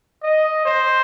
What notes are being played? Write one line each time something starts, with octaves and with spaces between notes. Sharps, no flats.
D#5
C5